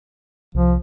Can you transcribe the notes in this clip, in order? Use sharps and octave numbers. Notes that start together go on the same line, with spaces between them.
C2 F3